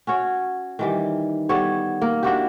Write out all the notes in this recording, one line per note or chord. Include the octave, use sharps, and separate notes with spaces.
C#4 F#4 C#5
D#3 E3 G3
G3 B3 A4 C#5
A#3
D4 E4 F#4 G4